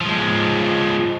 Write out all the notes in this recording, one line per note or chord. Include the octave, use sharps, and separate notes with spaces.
F3 G#3